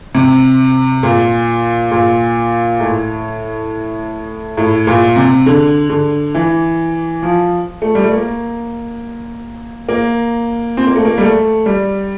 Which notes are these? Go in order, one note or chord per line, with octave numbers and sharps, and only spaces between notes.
C3
A#2
A#2
A2
A2
A#2
C3
D3
D3
E3
F3
A3
G3
A3
A#3
A#3
C4
A#3
A3
A#3
G3
A3
G3